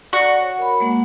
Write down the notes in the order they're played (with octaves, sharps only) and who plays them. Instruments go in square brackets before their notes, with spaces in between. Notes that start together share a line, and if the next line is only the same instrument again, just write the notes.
[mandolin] F#4 [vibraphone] D5 A#5
[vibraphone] C#5
A#4 B5
G#3 A#3 F#5